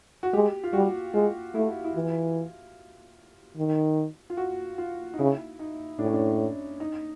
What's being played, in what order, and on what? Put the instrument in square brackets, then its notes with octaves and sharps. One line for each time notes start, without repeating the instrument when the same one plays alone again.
[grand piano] F#4
[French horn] G#3 [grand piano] G4
[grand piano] F4
[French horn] G3 [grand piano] F#4
[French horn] G#3 [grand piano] F4
[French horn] A3 [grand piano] E4
[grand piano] E4
[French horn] E3 [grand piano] F4
[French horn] D#3
[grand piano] F4
F#4
F4
D#4
[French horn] C#3 [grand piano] E4
[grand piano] D#4
[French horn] A2 [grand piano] D4
[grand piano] C#4
D4
D#4